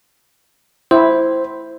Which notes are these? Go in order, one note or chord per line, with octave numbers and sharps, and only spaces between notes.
E4 C5